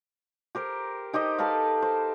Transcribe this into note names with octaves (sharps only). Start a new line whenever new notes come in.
G4 A#4 C5
D#4 G4 C5 D#5
G4 A4 B4 F5
C5